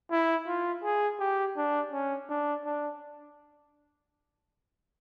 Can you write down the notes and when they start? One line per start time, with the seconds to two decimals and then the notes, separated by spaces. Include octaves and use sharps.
0.11 E4
0.47 F4
0.84 G#4
1.20 G4
1.57 D4
1.92 C#4
2.30 D4
2.65 D4